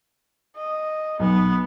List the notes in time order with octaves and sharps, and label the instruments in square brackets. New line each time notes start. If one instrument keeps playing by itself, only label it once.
[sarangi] D#5
[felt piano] B1 [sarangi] B3